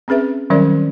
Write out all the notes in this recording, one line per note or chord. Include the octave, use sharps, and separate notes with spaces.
C4 C#4 G#4 B4 E5
D#3 F#3 G3 C#4 A#4 D5